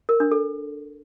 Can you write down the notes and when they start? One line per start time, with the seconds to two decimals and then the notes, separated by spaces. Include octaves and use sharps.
0.09 A#4
0.20 D4
0.31 A4